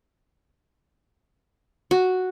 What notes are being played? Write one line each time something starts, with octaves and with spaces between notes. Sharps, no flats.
F#4